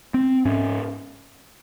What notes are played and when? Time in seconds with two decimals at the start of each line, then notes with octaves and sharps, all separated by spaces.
0.14 C4
0.45 G#2 C#4